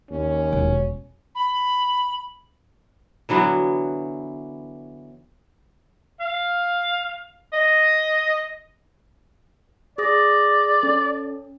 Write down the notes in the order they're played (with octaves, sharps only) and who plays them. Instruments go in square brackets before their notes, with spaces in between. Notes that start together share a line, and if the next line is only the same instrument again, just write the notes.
[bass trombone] D#2 [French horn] C#4
[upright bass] E1
[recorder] B5
[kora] D3 E3 F#3 B3
[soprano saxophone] F5
D#5
[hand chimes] G#4 D#6 A#6 [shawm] D5
[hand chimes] C#4 A4